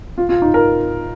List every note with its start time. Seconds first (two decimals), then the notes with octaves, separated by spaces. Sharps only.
0.18 F4
0.29 F4
0.42 D#4
0.54 A#4